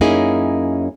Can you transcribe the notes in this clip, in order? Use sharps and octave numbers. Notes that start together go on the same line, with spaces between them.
F#2 A#3 C#4 D#4 E4 G#4